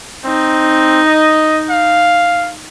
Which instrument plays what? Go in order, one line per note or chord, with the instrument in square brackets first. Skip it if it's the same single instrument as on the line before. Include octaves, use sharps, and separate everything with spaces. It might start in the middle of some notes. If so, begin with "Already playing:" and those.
[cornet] C4 [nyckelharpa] D#4
[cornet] D#5
F5